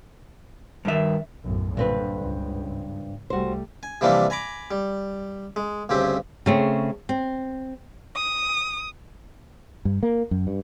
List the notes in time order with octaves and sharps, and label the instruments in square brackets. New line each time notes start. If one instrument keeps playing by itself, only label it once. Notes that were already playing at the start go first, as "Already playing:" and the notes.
[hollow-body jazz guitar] G2 E5 [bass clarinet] D#3
[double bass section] B1 F#2 A2
[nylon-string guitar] G2 C4 B4 [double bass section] A#2 D3
[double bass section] C#2 G#2
[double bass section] C2 G3 A3 [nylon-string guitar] F#4 C5
[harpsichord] G#5
C3 E3 F3 G3 A#3 D4
G#5 A#5 B5 D6
G3
G#3
D2 G2 C#3 C4 G4
[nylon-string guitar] C#3 A3 C4
C4
[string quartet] D#6
[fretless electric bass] G2
A#3
F#2
G2